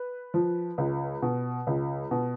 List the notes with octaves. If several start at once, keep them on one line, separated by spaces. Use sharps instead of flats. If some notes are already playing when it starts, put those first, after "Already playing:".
Already playing: B4
F3
C#2
B2
C#2
B2